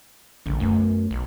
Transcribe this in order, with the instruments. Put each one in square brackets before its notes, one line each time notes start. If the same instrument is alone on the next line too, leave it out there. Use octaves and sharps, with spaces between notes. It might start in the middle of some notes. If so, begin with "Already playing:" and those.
[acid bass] A#1 [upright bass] D3 G3
[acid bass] F#2 [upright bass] A3 B3
[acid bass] B1